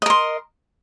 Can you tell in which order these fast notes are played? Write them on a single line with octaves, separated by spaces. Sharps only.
D#5 A#4 C6